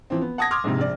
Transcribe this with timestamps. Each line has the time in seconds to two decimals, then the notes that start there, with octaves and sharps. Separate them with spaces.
0.10 E3 F3 C4
0.21 B3
0.38 F#5 A5 D#6 G#6 A#6
0.51 C6 D6 D#6 F6 G#6
0.64 A#1 G#2 C3
0.79 A#1 D5